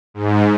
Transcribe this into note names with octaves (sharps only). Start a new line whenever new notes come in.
G#2